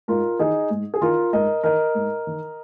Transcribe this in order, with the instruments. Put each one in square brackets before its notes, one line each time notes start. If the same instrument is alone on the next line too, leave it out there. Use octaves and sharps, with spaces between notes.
[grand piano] G#2 F4 A#4
D#3 D#4 G#4
G#2
G#4
D#3 F4 A#4
G#2 A#4 D#5
D#3 A#4 D#5
G#2
D#3